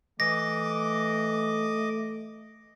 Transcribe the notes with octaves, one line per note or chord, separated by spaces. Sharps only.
E3 A3 D#5 D6 A#6